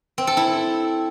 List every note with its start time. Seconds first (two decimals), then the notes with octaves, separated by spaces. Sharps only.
0.18 C4
0.27 A4
0.37 E4